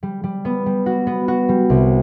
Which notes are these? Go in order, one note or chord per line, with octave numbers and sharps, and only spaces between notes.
G3
G3
B3
G3
F#4
B3
F#4
G3
C2